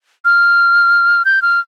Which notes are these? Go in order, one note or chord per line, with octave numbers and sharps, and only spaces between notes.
F6
G6
F6